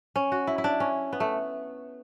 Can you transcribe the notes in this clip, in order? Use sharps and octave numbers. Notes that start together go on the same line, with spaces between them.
C#4
F#4
E4
E4
D4
C#4
B3
A3